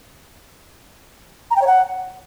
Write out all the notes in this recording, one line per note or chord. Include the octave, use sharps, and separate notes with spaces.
A#5
G5
C#5
F#5